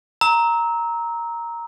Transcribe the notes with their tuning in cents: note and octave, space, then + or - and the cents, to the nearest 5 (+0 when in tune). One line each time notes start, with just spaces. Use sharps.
A#5 +0 E6 -30